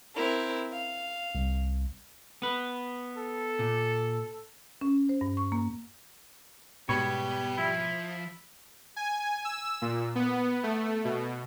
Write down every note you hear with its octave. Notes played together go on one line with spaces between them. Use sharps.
C4 E4 A#4
F5
C2
B3 B4
A4
A#2
C#4
C5
G2
C#6
A#3
G#2 B2 G3 B3 C#5 B5
F3 E4
G#5
E6
A#2
B3
A3
B2